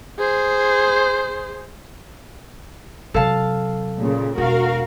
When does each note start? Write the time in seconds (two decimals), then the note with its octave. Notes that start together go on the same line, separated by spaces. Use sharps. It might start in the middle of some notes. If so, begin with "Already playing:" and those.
0.19 G#4 C5
3.14 C3 F#3 A4 F5 A5
3.99 A#2 C#3
4.38 E1 F#4 A#4 F5